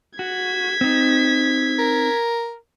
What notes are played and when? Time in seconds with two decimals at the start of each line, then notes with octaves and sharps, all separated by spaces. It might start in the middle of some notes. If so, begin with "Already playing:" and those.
0.19 F#4 G#6 B6
0.81 C4 D#4
1.79 A#4